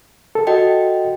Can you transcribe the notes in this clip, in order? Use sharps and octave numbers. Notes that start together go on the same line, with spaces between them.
A4
F#4 D#5 G5